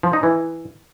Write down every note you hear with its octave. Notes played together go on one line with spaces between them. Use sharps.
F3
D#4
E3